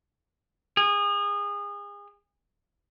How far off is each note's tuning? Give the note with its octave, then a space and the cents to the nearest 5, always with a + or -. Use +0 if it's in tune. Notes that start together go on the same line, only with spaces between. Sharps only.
G#4 -30